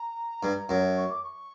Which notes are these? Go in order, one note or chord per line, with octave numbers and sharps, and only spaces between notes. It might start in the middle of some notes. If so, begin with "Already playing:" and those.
Already playing: A#5
G2
F#2
C#6
D6
C#6